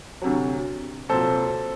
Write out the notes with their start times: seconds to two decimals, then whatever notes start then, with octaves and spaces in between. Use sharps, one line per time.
0.22 D2 C3 F#3
1.09 C2 A#2 F#3 A4 C5